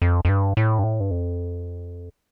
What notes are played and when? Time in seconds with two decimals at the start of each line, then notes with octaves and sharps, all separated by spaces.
0.02 F2
0.25 F2
0.29 G2
0.57 A2
0.79 G2
0.84 A2
1.00 G2
1.11 F2